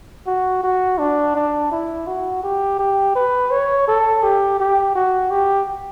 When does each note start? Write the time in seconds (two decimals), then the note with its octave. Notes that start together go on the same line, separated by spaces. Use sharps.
0.27 F#4
0.63 F#4
0.98 D4
1.36 D4
1.71 E4
2.07 F#4
2.43 G4
2.79 G4
3.15 B4
3.51 C#5
3.88 A4
4.23 G4
4.60 G4
4.95 F#4
5.31 G4